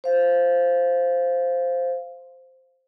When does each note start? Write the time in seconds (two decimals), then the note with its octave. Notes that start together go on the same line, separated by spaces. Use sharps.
0.04 C5 F5